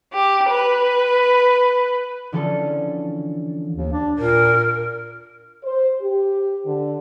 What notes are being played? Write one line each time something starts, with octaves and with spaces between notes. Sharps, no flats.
G4
B4
D3 E3 F3 C#4 A4
D#2
D4
A#2 A#4
C5
G4
D3